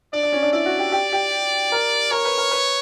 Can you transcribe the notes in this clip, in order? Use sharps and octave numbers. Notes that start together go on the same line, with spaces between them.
D4 D5
D4
C#4
D4
E4 D5
F#4
G4
G4
G4
A#4
A#4 C#5
B4
A#4
B4